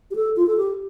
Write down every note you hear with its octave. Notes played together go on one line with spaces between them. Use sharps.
G4
A4
F4
A4
G4